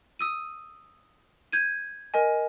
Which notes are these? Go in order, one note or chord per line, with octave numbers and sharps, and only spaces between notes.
D#6 E6 D#7
G6 G#6 D#7
A#4 D#5 G#5